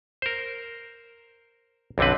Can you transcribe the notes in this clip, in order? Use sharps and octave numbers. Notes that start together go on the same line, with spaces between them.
A#4 C5
B1 F2 D3 C4 B4